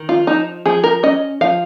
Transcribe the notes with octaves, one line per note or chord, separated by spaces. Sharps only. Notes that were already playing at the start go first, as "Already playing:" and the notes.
Already playing: D#3
F4
F3 D#4
F3 G#4
A#4
C#4 D#5
F3 F5